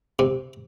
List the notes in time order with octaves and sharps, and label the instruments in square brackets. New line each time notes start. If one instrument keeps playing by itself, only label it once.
[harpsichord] C3